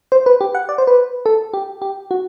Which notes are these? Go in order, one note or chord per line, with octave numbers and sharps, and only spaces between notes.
C5
B4
G4
F#5
D5
C5
B4
A4
G4
G4
F#4